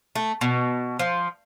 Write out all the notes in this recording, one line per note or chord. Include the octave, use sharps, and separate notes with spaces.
A3
B2
F3